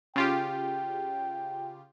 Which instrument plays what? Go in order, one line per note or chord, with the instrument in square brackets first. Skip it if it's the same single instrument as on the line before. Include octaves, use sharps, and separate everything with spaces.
[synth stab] C#3 F4 G4 [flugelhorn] G5